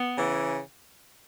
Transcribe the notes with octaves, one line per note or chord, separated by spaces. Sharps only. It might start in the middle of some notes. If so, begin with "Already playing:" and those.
Already playing: B3
C#3 E3